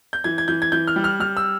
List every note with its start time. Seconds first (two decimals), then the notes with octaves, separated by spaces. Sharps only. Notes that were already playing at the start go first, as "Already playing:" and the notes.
0.13 G6
0.24 E3 G#6
0.38 G#6
0.48 E3 G6
0.62 G#6
0.72 E3 G6
0.88 F6
0.96 G3
1.04 F6
1.20 G3 F6
1.37 E6